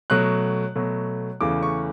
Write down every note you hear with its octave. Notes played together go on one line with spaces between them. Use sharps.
B2 F#3 A3 F#6
B2 F#3 A3
E2 C#3 E3 A3 D6
C#6